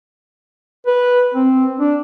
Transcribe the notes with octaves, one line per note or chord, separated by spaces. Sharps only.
B4
C4
D4